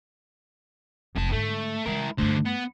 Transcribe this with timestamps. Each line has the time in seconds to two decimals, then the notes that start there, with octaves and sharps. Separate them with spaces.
1.15 F1 F2 F#3 A5
1.32 G#2 D3 A3
1.86 E3 G#3 E4 A#4
2.18 G2 D3 A3 C5
2.45 B3